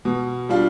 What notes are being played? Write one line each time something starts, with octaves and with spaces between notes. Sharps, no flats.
B2
G3 D4 F4